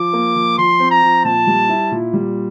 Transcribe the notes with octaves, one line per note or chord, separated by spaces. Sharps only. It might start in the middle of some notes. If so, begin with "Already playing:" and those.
Already playing: F3 D6
A#3
F3
F3 C6
C4
A#5
F3
A#2 A5
G3
E4
A#2
G3